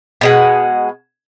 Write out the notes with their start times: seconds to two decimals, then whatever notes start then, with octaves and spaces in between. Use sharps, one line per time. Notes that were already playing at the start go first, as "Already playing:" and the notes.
0.21 B2 G#3 F#5